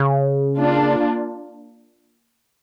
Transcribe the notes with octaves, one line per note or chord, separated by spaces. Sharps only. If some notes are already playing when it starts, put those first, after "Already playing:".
Already playing: C#3
A#3 D4 F4